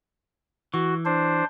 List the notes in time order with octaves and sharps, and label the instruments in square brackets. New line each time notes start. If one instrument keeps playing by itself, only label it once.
[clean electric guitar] E3 [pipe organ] F#4
[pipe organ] D4 C5